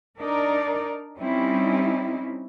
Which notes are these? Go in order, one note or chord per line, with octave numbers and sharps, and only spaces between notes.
D4 D#4 A#4 D5
G3 C4 C#4 D#4 E4